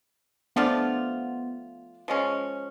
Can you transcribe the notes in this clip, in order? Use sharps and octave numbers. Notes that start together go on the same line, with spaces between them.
F3 A3 B3 D4 F4
F3 G#3 C#4